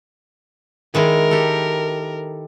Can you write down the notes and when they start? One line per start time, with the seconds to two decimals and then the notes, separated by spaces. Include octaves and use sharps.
0.94 D#3 G#3 E4 A#4
1.31 G4 A4